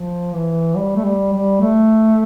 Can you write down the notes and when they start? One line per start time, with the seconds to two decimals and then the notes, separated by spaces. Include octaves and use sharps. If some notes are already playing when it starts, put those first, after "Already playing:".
Already playing: F3
0.33 E3
0.76 G3
0.96 A3
1.04 G3
1.33 G3
1.61 A3